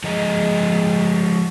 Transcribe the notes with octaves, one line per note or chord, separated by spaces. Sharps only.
F3 G#3 D#5 A#5